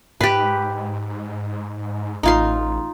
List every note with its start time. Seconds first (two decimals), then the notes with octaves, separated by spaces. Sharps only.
0.21 G#2 G4 B4
2.23 A1 D#4 F4 C6